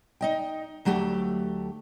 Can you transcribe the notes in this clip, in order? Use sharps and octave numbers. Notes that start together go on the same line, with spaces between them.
D#4 D#5 G5
D2 F#3 A3 G4